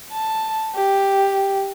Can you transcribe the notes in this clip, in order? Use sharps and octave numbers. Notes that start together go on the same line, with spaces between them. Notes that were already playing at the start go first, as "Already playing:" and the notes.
A5
G4